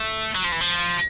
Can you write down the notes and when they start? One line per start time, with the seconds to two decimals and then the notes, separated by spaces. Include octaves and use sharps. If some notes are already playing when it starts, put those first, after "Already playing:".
Already playing: A3
0.35 F#3
0.44 F3
0.52 E3
0.61 F3